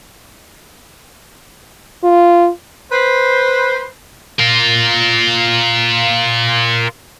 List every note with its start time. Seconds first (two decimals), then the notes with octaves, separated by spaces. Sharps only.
2.04 F4
2.92 B4 C5
4.39 F4 A#4